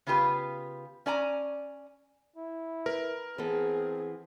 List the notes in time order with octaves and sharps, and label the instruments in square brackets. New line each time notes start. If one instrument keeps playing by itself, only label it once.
[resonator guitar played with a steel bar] C#3 B3 F4 G4 B4
C#4 D5 G#5 A#5
[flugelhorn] E4
[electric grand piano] A#4 [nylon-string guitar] B4
[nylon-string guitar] E3 B3 A4 [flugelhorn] C4 [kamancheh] G#4